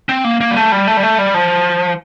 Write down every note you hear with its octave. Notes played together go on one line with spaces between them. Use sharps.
C4
A#3
A#3
G3
A3
G3
A3
G3
A3
G3
F3